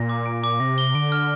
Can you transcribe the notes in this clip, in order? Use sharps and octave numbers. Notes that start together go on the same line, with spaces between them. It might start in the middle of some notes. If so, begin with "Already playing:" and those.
Already playing: A#2 A#6
D6
D7
D6
C3 A#6
G7
D3 D7
F6